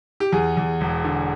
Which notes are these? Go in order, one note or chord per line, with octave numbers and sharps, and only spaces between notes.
G4
E2 G#4
E2
E1
D3